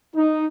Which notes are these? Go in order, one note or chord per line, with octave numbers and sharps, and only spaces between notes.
D#4